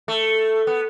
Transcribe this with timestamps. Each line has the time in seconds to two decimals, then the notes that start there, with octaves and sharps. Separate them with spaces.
0.08 A3
0.67 B3